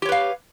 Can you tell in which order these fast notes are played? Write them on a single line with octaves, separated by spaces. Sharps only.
G4 C#5 B4 F5